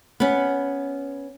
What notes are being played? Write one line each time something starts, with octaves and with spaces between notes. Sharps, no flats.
B3 C#4